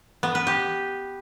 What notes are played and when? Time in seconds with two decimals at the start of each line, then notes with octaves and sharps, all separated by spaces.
0.23 B3
0.35 B4
0.47 G4